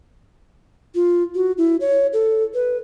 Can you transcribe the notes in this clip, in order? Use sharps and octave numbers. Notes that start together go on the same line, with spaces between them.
F4
F#4
E4
C#5
A4
B4